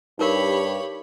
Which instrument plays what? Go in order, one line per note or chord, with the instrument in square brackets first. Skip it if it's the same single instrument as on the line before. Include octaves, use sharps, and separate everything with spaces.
[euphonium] G2 [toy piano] D#4 A#4 [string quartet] G4 C#5 B5